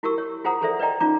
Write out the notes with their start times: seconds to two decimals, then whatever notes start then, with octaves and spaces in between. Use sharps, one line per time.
0.03 E4 F#4 G4 A#4 C#6 E6
0.18 C#5
0.44 F4 G#4 C5 F#5 A#5 D#6
0.62 G#4 A4 C5 D5 E5 D#6
0.79 B4 D5 D#5 G5 A#5
1.00 C#4 D#4 F4 D5 A#5 D6